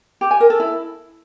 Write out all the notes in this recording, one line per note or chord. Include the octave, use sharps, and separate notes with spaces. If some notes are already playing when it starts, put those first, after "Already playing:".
G4
G#5
A#4
A4
E4